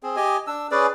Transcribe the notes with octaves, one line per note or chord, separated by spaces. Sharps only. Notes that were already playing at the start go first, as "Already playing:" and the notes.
C4 G#4
G4 D#5 G#5
D4 E6
C#4 G#4 B4 D5